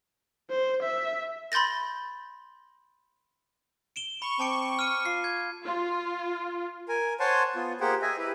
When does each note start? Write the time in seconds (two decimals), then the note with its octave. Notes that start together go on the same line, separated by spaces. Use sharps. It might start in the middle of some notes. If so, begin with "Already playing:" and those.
0.50 C5
0.83 E5
1.52 B5 C6 G6 A6 A#6
3.96 D7 E7 G7
4.22 B5 C#6
4.40 C4 A5 D6 D7
4.79 F6 D#7
5.05 F4 C7
5.24 G#6
5.66 F4
6.89 A#4 G#5
7.20 C5 C#5 F#5 G#5 A5 C6
7.56 B3 F4
7.81 A#3 G4 G#4 C5 F#5 G5
8.02 G#4 D#5 E5 G5 G#5
8.18 E4 G4 B4